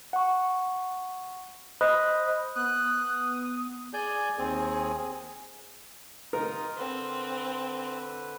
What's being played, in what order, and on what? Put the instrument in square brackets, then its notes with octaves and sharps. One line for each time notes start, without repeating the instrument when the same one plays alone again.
[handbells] F#5 C#6
C5 D#5 B5 D#6 F#6
[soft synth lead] B3 [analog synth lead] D#6 [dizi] F#6
[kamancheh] G#4 [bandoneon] D5 G#5 G6
[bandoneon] D#2 C4 [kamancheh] G#4
[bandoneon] D#4 F4 D#6 [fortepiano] A#4
[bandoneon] D3 B4 [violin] C4